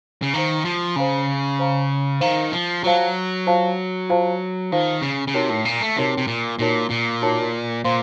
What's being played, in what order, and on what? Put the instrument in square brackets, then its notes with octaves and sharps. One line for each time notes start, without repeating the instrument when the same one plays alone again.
[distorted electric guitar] C#3
[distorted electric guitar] D#3 [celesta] C5 F5 A#5
[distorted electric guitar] F3
[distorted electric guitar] C#3 [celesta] C5 F5 A#5
[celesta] C5 F5 A#5
[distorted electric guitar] D#3 [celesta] C5 F5 A#5
[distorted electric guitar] F3
[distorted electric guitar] F#3 [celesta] F4 C5 F5 A5
[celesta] F4 C5 F5 A5
F4 C5 F5 A5
[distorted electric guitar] D#3 [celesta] F4 C5 F5 A5
[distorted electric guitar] C#3
C#3
[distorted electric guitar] C3 [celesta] D#4 F#4 A#4 C#5 A5
[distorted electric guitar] A2
A#2
A3
[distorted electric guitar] C3 [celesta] D#4 F#4 A#4 C#5 A5
[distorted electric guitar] C3
A#2
[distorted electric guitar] A#2 [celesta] D#4 F#4 A#4 C#5 A5
[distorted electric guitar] A#2
[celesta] D#4 F#4 A#4 C#5 A5
[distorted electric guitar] A#2 [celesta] C5 F5 C6